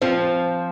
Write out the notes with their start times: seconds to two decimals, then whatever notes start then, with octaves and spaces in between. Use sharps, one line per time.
0.02 F3 C4